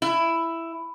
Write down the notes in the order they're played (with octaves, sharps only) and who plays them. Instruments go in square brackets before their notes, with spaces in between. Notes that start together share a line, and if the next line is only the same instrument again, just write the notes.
[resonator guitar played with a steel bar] E4